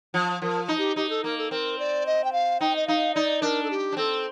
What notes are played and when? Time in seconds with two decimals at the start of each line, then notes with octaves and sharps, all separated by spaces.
0.14 F3
0.42 F3 A#4
0.68 D#4
0.78 G4
0.96 D#4 G4
1.09 A4
1.24 A#3 A#4
1.38 A4
1.51 C4 A#4
1.79 D5
2.06 D#5
2.24 G5
2.32 F5
2.60 D#4 G5
2.76 D#5
2.87 D#4 F5
3.15 D#4 D5
3.42 D4 A#4
3.63 A4
3.70 G4
3.92 D4
3.97 C4 A4